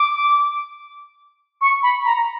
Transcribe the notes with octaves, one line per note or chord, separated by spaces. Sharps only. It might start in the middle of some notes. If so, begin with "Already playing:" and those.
Already playing: D6
C#6
B5
A#5